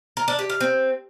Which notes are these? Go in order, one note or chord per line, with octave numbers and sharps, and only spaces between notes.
A#4
D4
G4
F5
C4